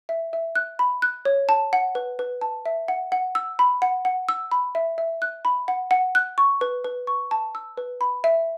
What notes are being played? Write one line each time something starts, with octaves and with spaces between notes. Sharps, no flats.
E5
E5
F#6
B5
F#6
C#5
A5
F#5
B4
B4
A5
E5
F#5
F#5
E6
B5
F#5
F#5
E6
B5
E5
E5
F#6
B5
F#5
F#5
F#6
C#6
B4
B4
C#6
A5
E6
B4
B5
E5